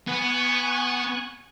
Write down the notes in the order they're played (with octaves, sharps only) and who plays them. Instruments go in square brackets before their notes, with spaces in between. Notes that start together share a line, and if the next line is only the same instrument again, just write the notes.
[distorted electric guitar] B3 [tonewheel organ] G#5 C#6 F#6